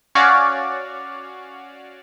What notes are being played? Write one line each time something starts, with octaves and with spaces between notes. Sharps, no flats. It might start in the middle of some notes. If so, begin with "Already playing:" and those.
C#4 F#4 C#5 D5 F5